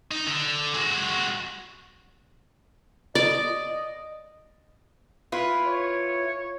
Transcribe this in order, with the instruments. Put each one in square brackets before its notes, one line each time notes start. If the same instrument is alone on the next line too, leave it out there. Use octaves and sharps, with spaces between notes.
[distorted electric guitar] D#4
D3
G#3 F#4
[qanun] D5 [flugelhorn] D#5
[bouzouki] E4 F4 B4
[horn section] C#5